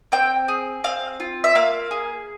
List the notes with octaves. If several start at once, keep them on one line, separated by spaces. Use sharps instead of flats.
C4 G5
G#4
C4 F5
F4
E5
A#3 F5
G#4